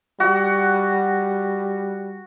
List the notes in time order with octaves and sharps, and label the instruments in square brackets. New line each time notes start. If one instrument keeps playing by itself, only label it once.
[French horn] G3 [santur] F#4